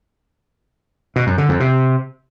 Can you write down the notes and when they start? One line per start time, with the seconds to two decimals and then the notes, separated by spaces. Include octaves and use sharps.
1.16 B2
1.27 F#2
1.38 D3
1.49 F2
1.60 C3